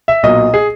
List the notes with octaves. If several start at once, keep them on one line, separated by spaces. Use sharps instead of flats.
E5
B1 A#2 F#3 D#5
G#4